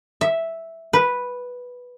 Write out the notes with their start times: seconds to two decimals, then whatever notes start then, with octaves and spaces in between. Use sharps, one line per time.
0.21 E5
0.93 B4